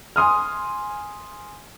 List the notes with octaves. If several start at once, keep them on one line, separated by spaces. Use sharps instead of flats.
G#5 C6 D#6 F6